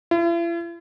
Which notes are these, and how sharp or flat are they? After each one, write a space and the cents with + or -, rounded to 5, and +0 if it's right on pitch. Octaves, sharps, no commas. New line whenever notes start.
E4 +45